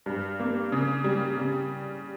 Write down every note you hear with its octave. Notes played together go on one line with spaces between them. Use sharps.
G2
A#3
C#3
G3
C#3